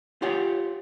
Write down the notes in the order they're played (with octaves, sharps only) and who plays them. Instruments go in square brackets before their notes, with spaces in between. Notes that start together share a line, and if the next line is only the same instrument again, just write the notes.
[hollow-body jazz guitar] F4 G4 C#5 F#5 G5